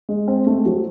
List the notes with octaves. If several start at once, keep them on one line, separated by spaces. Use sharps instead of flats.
G#3
C4
A3
F#3